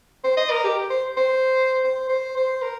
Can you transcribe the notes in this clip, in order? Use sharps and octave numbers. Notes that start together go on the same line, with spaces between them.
C5
D#5
A#4
G4
C5
C5
C5
C5
C5
A#4